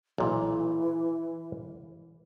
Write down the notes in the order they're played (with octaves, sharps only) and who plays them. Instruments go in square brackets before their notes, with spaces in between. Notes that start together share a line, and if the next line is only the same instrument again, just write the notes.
[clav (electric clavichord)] B1 A#2 [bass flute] E3